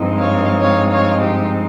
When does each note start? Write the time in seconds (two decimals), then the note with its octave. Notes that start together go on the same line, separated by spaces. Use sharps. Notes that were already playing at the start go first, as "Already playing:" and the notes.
Already playing: G2 F3 G#3 C4 D#4
0.18 C#5 F5
0.61 C#5 F5
0.91 C#5 F5
1.21 G4